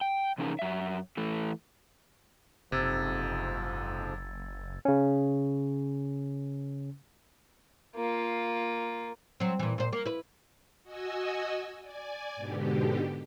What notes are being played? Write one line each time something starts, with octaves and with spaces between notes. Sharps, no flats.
G5
C3 E3 C#4 D#4 G#4 A#4
F#2 E5
E3 A3
F#1 F2 G#2 C3 F3 E6 G#6 A6
C#3 C#4
A#3 F4
F#3 C4
A#2 E3
A#2 C5
A#3
E4 B4
F#4 D#5 G#5 E6
D5 G#5
G#2 B2 D3 G4